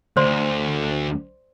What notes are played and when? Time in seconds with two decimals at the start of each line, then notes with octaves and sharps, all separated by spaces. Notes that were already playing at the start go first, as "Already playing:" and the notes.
0.17 D2 C5 D5 C6